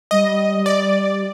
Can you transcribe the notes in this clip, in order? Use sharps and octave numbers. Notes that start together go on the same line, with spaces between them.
G3 D#5
D5